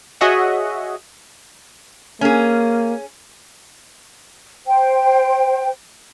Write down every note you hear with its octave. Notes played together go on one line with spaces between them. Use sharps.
F#4 G#4 C#5 D#5 E5 F#5
A#3 C#4 G#4
C5 G5